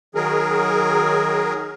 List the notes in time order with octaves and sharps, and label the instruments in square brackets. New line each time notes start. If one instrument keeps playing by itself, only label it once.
[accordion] D#3 F#3 G#4 A#4